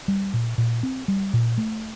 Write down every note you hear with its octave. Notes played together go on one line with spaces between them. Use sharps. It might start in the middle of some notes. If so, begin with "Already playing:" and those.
G3
A#2
A#2
C4
G3
A#2
A3